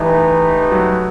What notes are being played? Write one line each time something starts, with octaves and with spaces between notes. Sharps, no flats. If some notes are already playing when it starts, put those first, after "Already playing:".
Already playing: E3 A3 D#4 G4 B4
F#3